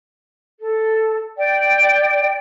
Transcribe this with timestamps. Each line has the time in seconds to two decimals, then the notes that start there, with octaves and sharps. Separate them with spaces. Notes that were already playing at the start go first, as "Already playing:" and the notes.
0.60 A4
1.38 D5 G5